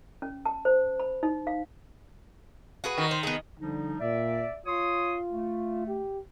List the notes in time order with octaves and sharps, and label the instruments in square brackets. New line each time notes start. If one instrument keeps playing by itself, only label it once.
[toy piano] C#4
A5
C5
B5
D#4
F5
[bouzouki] F#4 G#4 B4
[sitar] D#3
[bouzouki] C5
B3 G#4
[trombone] D3 [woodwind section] F3 G3 D#4
[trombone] A#2 [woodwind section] D5 E5
[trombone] F4 [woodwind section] C#5 C6 D#6
[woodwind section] A3
[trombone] G4